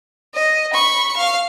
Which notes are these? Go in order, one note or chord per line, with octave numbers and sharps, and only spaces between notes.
D#5
B5 C#6
F5